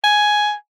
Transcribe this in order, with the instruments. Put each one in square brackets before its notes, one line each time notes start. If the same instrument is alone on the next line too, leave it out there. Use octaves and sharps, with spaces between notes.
[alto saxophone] G#5